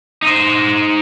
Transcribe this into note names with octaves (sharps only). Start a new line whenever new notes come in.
D#4 C5